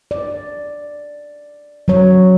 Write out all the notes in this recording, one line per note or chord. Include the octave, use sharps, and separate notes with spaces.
D5
F#3 C#5